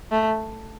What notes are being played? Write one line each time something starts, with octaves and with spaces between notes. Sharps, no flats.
A3